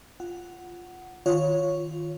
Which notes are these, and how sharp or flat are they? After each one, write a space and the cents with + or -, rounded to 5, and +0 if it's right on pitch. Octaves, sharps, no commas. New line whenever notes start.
F4 -5 F#5 +0
D#3 +0 F4 +0 C#5 +0